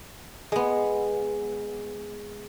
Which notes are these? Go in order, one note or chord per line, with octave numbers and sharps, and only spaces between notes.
G#3 B3